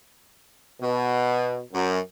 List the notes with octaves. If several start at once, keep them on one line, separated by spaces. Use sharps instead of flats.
B2
F#2